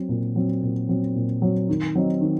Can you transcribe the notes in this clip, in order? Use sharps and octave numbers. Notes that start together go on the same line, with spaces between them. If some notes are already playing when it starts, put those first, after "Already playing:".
Already playing: F#3 C4
A#2
F#3 C4
A#2
F#3 C4
A#2
F#3 C4
D#3
F#3 C4 D#4
D#3